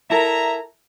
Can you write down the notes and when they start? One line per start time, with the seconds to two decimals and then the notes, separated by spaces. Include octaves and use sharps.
0.10 E4 A4 A#4 E5 A#5